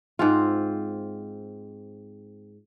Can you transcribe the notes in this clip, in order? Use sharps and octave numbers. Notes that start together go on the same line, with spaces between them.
G#2 C4 F4